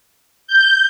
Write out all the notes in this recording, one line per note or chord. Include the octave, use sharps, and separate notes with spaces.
G6